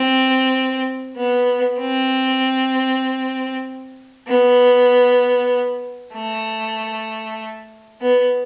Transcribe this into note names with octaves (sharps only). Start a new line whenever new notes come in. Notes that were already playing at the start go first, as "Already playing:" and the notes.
Already playing: C4
B3
C4
B3
A3
B3